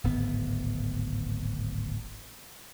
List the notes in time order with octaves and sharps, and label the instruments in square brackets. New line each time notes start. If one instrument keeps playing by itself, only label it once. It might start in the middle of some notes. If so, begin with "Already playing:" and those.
[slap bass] D1 G#1 B3